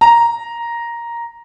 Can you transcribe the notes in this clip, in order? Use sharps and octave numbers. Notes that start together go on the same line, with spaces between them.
A#5